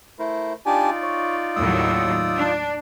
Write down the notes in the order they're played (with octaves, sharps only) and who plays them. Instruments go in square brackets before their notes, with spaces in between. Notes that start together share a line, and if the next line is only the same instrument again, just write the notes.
[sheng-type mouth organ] A3 A#4 C5 [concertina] E4
[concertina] D4 G4 G#5 [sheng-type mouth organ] D#4 F4 D5
[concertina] C#5
[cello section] D#2 A2 F#3 [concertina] D#6 E6
[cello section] D4